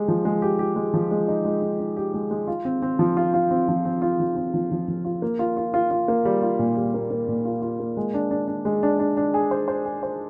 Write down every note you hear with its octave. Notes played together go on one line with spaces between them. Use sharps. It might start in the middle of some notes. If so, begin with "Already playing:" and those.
Already playing: G#3 G4
F3
G#3
G4
G4
G#3
F3
G#3
D#4
G#3
D#4
D#4
G4
G#3
G#3
F4
C4
C4
F3
F4
F4
C4
F3
C4
F4
F3
C4
F3
F3
F3
F4
A#3
F4
F4
F4
F4
A#3
G3
F4
A#2
G3
A#3
A#3
A#2
F4
F4
A#3
G#3
D4
D4
D4
G#3
D4
D4
D4
G#4
C5
C5
G#4
C5